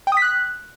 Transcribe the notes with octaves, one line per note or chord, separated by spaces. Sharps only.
G5
D#6
B6
F#6